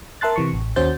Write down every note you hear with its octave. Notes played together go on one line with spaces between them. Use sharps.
A#4 E5 A5 C6 F#6 A6
C3 E3 C#6
A1
D#2 C#4 F#4 C5 G6 A6